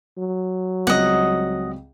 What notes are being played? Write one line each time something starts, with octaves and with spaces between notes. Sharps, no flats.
F#3
C#2 G3 C4 D#5 F#5